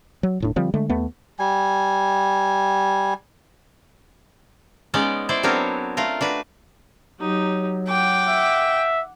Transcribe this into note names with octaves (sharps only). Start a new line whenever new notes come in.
F#3
D#1 A2 D4
D3 F3 G3 C4
D3 G#3 A3
D#2 A3 B3
G3 G#5
G#3 B3 C#4 D#4 D5
E4 C5 D5
F#3 B3 C4 D4 A#4 C#5
A3 F4 A#4
D4 F#4 B4
F#3 D#4 G4
F#5 G5 D6
E5